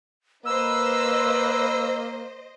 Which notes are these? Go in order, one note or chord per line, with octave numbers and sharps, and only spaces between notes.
A#3 B4 C5 D#5 E6